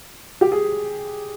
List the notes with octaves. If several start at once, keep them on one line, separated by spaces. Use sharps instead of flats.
G4
G#4